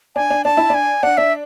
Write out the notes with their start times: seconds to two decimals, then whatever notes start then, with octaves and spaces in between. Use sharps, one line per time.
0.16 D4 G#5
0.30 D4
0.45 D4 A5
0.57 E4
0.70 D4 G#5
1.03 D4 F#5
1.17 D4 E5